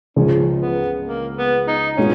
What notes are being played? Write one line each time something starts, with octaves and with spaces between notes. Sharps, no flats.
C#2 C#3 F3 C#4
B3
A#3
B3
D#4
B2 G#3 B3 C#4 F4